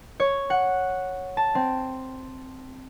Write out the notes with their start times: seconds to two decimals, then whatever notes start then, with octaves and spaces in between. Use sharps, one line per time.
0.20 C#5
0.50 F#5
1.37 A5
1.55 C4